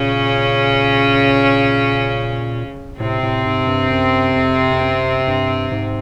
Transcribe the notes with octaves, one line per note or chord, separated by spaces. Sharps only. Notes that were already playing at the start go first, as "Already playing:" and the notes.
Already playing: A#2 C#3 C#4
A2 C3 C4
A2
G#2
G2
F#2
F2
F2
F#2
G2
G#2